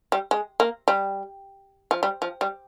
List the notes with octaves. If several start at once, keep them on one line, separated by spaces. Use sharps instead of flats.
G3
G#3
A#3
G3
F3
G3
F3
G3